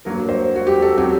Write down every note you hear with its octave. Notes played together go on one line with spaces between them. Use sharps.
G2 F#3 A#3 A#4
C5
F#4
G4
A4
F#3 C4 G4